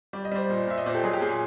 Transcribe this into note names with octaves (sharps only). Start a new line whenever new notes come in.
G3 D5
D#5
G3 C5 D5
A#2
A#2 E5
D#5
A#2 C5 D5
G4 A4
F#3 G#4
G4
A#2 G#4